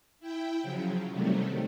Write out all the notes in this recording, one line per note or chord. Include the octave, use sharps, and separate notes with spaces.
E4 G5
C#3 F3 F#3
C3 D#3 F#3 G3 A3